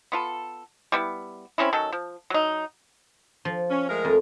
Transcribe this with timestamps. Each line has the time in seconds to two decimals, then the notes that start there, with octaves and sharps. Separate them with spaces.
0.12 B3 F4 A4
0.92 G3 B3 E4
1.58 C4 C#4 D#4 E4
1.73 D#3 F#3 C#4 A4
1.92 F3
2.30 F#3 D#4
3.45 F3
3.70 C#4
3.88 G#3 A3 A#4
4.05 F2